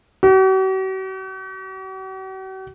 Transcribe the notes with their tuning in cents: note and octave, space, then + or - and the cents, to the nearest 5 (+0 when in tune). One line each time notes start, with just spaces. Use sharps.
F#4 +45